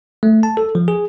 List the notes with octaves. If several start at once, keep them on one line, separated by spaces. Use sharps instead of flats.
A3
A5
A4
F3
G#4